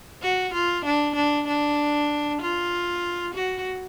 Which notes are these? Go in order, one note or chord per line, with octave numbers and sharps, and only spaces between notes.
F#4
F4
D4
D4
D4
F4
F#4